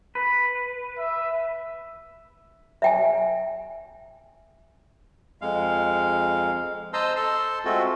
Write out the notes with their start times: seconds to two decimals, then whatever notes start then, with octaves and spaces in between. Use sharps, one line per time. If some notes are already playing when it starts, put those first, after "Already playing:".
0.15 B4
0.98 E5
2.82 E5 G5 G#5
5.41 F2 G#3 F5
6.93 C5 D#5 A5 A#5 C6 E6
7.16 A4 A5 C6
7.65 G#3 A3 C4 F4 F#4 A4